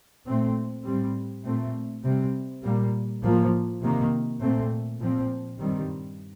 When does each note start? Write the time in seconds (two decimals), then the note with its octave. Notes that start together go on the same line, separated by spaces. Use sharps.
0.26 A#2 A3 C4
0.85 A2 G3 C4
1.45 A#2 A3 C4
2.04 C3 G3 C4
2.63 A#2 G3 A#3
3.22 A2 F3 A#3
3.82 C3 D#3 A#3
4.40 A#2 A3 C4
5.00 A#2 F3 C4
5.59 G2 D#3 G3 C4